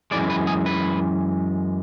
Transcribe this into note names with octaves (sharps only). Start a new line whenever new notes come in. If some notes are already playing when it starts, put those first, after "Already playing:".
F#2 E3 G#3 D5
B4
G#4
B4